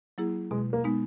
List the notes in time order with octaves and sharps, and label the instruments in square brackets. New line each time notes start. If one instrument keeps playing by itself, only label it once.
[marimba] F#3 A#3 E4 G#4
[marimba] B2 [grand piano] G#3
[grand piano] A#3
[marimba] G#3 B3 D#4